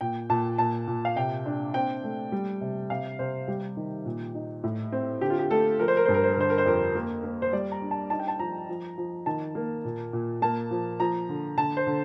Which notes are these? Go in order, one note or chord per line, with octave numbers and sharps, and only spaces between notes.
A#2 G5
A#2 A5
A#2 A5
A#2
F5
C3 G5
D4
C4 G5
A3
G3
C3
C3 F5
C3 C5
G3 G4
D#3
A#2
D#4
A2
C4
D3 G4
F4
G4
A3 A4
F3 A#4
C5
A#4
G2 C5
A#4
C5
A#4
D3 C5
A#4
C5
F2 A#4
A#3
A#3
C5
G3 D5
A#5
D4
A5
D#4 A5
G5
A5
F3 A#5
F3
F3
D#3 A5
A#3
A#2
A#2
A#3 A5
F3
F3 A#5
D3
D3 A5
C5
D3